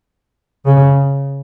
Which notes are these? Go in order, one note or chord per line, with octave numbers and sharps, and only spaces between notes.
C#3